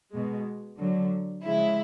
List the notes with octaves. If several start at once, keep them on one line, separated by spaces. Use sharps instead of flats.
B2 G#3
D3 F#3
C#3 F3 G#3 E4